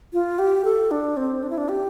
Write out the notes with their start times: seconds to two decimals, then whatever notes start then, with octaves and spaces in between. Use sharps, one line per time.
0.13 F4
0.39 G4
0.65 A4
0.91 D4
1.17 C4
1.43 D4
1.50 E4
1.58 D4
1.69 G4